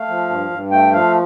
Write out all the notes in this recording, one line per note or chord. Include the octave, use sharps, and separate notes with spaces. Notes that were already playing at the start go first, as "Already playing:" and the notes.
Already playing: A3 F5
F3
G2
G2
A3 G5
F3 F5